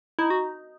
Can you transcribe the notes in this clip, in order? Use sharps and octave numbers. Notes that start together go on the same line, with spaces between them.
D#4 E4
F#4